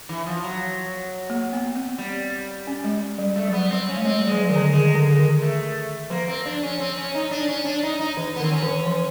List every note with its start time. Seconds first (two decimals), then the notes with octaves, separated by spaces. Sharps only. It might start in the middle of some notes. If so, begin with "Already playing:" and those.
0.09 E3
0.26 F3
0.43 F#3
1.30 A#3
1.53 B3
1.76 C4
1.98 G3
2.67 C#4
2.84 G#3
3.19 G3
3.36 G3 A3
3.48 F#3 B3
3.62 G3
3.70 C4
3.88 C#4
3.97 A3
4.05 G#3 C4
4.22 G3
4.27 F3 G#3
4.38 F#3
4.49 D#3 G#3
4.56 D3
4.73 D#3 G#3
4.96 D3
5.08 G#3
5.19 D#3
5.42 A3
6.10 F3 A#3
6.28 C4
6.45 D4
6.63 C#4
6.79 C4
6.97 C#4
7.15 D#4
7.31 D4
7.48 C#4
7.65 D4
7.83 D#4
8.00 D#4
8.17 E3
8.36 B3
8.40 D#3 C4
8.51 C#4
8.62 E3
8.86 F3